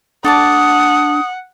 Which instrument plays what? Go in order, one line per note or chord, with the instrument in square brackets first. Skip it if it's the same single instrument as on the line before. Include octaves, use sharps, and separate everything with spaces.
[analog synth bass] D4 [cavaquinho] A4 D5 A5 [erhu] F#5 [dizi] D#6